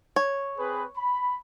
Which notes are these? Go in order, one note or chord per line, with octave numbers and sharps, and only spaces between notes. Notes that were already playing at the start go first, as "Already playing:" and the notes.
C#5
C4 G#4 B4
B5